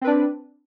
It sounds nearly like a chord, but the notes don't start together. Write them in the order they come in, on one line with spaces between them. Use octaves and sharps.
C4 B4 D4